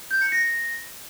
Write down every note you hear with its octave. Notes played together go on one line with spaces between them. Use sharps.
G6
C#7
A#6